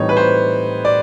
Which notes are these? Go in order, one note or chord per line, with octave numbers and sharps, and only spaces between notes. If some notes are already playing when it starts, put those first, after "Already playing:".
Already playing: A2 E3 G3 C4 D#4 C#5
B4
C5
D5